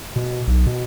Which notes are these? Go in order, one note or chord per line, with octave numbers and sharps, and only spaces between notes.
B2
B1
B2